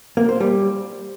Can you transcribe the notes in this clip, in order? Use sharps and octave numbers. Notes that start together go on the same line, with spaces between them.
A#3
C5
G3